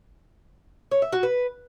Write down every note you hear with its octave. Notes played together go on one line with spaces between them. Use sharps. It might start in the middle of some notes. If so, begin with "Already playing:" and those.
C#5
E5
F#4
B4